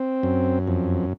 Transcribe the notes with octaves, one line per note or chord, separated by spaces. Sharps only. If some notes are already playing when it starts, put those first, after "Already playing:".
Already playing: C4
F#2
F2